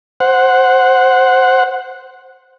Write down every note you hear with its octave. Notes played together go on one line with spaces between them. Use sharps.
C5 F#5